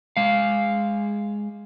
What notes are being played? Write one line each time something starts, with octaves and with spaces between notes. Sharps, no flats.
G#3 F5